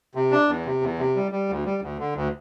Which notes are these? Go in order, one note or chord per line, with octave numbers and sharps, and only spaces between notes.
C3
D4
E2
C3
E2
C3
G3
G3
D2
G3
D2
D3
D2